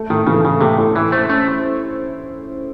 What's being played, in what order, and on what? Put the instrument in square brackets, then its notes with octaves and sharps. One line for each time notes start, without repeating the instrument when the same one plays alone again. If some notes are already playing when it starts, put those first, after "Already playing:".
Already playing: [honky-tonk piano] A3
[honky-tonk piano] A2 [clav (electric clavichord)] D#3
[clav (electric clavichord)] C#3 [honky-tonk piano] E3
[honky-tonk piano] A2 [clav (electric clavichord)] C#3
[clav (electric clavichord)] C3 [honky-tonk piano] A3
[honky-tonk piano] A2
[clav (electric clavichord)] E3 [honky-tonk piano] E4
[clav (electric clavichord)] A3 [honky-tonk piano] C5
[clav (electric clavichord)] A3 [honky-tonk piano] C#4